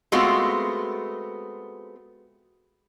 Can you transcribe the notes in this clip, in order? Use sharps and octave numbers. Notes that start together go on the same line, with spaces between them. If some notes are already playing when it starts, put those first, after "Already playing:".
G#3 A3 B3 C4 F4 F#4